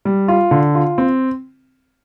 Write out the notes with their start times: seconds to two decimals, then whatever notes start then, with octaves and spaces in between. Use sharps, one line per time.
0.05 G3
0.28 F4
0.51 D3
0.75 F4
0.98 C4